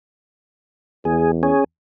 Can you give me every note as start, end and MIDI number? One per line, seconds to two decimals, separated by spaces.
1.05 1.53 40
1.05 1.31 68
1.43 1.64 61
1.43 1.64 68